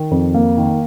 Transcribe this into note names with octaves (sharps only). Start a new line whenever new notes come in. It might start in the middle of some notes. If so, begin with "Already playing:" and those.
Already playing: D#3
F2
A#3
D#3